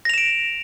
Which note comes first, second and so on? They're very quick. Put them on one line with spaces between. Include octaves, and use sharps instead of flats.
A#6 F7 E7 D7